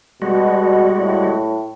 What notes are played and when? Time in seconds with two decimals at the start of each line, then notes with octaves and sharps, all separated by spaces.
0.22 B2 G3 G#3 F#4
0.98 A2